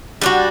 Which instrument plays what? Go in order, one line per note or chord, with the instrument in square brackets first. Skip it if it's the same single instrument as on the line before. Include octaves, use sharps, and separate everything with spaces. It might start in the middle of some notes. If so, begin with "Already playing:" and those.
[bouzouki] G3 D4 F#4